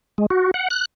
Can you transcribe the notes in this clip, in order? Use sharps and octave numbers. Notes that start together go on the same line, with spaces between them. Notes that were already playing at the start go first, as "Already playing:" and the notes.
G#3
F#4
F#5
F#6